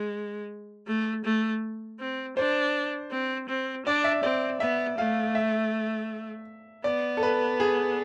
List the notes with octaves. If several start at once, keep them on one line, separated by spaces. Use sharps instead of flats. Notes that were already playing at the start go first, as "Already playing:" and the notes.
Already playing: G#3
A3
A3
C4
D4 C5
C4
C4
D4 D5
E5
C4 D5
B3 E5
A3 F5
E5
B3 D5
A4
B4
G#4